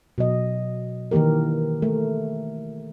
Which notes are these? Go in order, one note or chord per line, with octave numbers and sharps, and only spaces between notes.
B2 F#3 D#5
D#3 E3 A#3 G4 A#4
A3 A#4